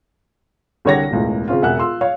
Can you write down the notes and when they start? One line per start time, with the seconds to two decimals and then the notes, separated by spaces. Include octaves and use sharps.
0.85 C2 D3 G4 C#5 F#5 A#6
1.11 E1 C#2 A2
1.48 C#3 C4 C#4 F4
1.62 E1 E5 F#5 G#5 F#6
1.78 F4 C6 E6
2.01 C#5 F5